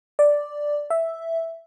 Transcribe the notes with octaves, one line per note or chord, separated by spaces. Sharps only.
D5
E5